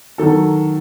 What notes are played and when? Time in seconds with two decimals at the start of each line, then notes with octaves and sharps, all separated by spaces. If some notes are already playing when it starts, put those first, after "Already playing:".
0.18 D#3 F#3 A4